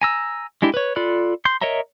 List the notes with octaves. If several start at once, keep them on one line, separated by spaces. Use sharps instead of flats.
G#5 A#5 E6
G#3 D4 E4 G4
B4 C#5
F4 A4 D5 B5 F#6
C6 G6
A#4 C#5 D#5 E5 A#5